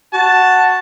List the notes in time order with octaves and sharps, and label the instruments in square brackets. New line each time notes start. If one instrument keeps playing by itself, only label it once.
[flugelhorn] F#4 [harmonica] A5